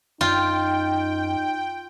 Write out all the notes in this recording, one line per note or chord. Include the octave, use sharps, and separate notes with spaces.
F#2 D#4 F4 G5